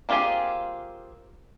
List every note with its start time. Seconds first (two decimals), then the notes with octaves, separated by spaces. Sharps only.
0.09 A#3 C4 F4 G4 G#4